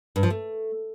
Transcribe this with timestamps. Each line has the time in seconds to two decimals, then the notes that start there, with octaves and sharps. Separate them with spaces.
0.16 G2
0.23 F3
0.30 A3